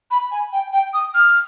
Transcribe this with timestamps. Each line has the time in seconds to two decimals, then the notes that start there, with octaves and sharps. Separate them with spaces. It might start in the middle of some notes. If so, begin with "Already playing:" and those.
0.11 B5
0.31 G#5
0.52 G5
0.73 G5
0.94 D#6
1.15 F6